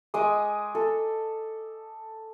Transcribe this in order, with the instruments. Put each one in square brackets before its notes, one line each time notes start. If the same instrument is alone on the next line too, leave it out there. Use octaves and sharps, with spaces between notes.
[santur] G#3 G#5 D6 D#6
A4